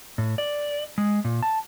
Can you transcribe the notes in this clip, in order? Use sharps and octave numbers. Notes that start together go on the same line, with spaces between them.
A2
D5
G#3
A#2
A5